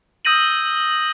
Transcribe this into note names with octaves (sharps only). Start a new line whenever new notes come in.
D#6 E6 G6 A#6 D#7 F#7